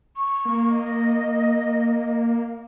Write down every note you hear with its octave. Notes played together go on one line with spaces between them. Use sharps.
C#6
A#3
D#5